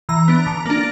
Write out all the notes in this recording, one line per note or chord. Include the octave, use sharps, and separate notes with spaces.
E3 A#5
B3 D4
D3
A#3 D4